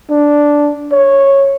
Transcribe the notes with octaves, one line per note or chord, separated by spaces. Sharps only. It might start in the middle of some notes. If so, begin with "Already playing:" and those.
D4
C#5